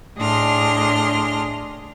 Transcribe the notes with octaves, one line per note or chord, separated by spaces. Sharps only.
A2 D4 G#4 D#5 C6 F6